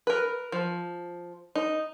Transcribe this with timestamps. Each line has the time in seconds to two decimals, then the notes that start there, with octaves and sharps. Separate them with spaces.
0.07 A#4 B4
0.52 F3
1.55 D#4